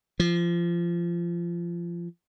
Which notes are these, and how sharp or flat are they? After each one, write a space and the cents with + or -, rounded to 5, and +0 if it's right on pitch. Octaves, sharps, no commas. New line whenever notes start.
F3 -25